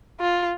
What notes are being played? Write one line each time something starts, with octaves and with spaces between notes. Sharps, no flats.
F4